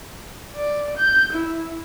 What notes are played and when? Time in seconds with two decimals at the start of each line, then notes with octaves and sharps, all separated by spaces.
0.56 D5
0.98 G6
1.33 E4